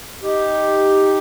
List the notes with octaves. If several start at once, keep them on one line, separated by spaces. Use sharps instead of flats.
D#4 G4